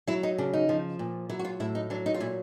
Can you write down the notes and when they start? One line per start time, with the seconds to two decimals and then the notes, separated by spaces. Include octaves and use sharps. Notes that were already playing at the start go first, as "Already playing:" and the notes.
0.07 F#3 E4
0.23 D#4
0.38 C#3 D4
0.53 D#4
0.69 F3
0.99 A#2
1.29 F#3 E4
1.39 F#4
1.45 F4
1.60 A2 E4
1.75 D#4
1.90 F#3 D4
2.06 D#4
2.14 F4
2.20 A#2 E4